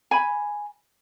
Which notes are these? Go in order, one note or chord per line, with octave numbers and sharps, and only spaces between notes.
G#5 B5